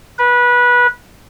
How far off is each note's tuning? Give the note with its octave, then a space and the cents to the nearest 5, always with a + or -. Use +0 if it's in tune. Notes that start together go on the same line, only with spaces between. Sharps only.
B4 -20